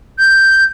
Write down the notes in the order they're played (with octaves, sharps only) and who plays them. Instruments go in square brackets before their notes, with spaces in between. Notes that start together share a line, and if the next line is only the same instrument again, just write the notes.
[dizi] G6